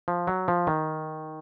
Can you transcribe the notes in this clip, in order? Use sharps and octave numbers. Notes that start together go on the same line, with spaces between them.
F3
F#3
F3
D#3